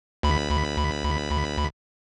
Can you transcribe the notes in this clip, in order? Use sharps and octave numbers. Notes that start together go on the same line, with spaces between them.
D2 B5